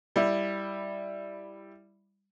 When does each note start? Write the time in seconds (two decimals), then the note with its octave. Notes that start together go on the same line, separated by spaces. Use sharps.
0.16 G3 E4